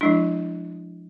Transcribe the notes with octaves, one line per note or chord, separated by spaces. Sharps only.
F3 G#3 D4 E4